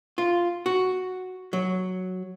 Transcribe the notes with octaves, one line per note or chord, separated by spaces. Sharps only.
F4
F#4
F#3